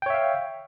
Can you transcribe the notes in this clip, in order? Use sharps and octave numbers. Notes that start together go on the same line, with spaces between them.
C#5 E5 F5 G5